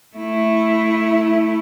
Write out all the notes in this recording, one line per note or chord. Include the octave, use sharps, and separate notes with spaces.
A3 E4